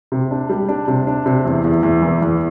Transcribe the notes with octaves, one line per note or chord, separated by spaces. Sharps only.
C3
D4
G3
D4
C3
D4
C3
E2
E2
E2
E3
E2